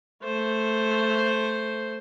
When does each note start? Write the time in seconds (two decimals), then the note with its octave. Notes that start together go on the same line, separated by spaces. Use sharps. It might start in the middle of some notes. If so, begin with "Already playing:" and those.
0.24 A3 C5